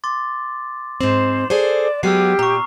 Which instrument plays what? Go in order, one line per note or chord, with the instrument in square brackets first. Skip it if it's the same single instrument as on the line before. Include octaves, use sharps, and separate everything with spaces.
[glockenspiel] C6 D6 A6
[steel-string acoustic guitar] G#2 C4 [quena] C5 [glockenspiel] E7 F#7
[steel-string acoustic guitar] G#4 A4 C5 [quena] D5
[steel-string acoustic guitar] F#3 G#3 B3 [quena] G4 [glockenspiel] E6 F6 C7
[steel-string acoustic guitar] A#2 [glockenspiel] A#5 C#6